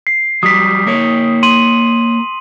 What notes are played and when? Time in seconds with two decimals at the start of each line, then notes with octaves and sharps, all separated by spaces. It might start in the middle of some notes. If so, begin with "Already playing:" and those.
0.07 C7
0.43 F#3 G3 D#6 B6
0.87 A#3 A#4 C#5
1.43 C6 D#7 F#7